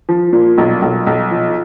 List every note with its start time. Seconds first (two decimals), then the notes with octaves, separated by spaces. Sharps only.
0.09 F3
0.33 A#2
0.58 B1
0.82 B1
1.07 B1
1.31 F3